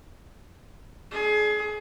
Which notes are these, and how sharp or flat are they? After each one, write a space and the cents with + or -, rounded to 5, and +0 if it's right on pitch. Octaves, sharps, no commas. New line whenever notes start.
D4 +5 G#4 +25